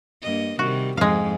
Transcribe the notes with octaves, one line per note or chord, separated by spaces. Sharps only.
G2 A#3 D#5
C3 D#3 G3 F#4
F2 G#2 F3 G#3 F5